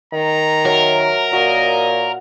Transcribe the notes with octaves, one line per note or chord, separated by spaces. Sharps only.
D#3 A#5
F#3 A#4 E5
A#2 F#4 D#5